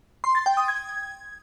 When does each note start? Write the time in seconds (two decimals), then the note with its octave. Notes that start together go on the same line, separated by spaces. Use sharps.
0.24 C6
0.35 A6
0.46 G5
0.57 D#6
0.68 G#6